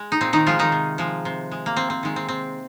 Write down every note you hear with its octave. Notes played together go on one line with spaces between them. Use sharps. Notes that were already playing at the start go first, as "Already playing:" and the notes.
Already playing: G#3
D#4
A#2 C4
D#3 D#4
F3 G#3 F4
D#3 D#4
C3
F3 G#3
C3
G#3
A#3
C3 C4
C4
D#3 G#3
C4
C3 C4